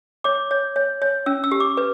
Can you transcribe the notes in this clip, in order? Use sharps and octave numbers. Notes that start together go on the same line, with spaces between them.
C#5 D6
C#5
C#5
C#5
C#4 E6
E6
G4
D6
B4